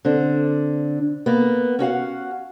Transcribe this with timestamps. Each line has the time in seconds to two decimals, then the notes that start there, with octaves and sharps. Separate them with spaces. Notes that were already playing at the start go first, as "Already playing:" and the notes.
0.05 D3 C4 D4
1.26 A#3 B3
1.79 C#4 F#4 F5 F#5